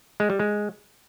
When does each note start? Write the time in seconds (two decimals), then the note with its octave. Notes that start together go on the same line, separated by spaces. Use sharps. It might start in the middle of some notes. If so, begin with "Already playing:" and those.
0.20 G#3
0.30 G3
0.39 G#3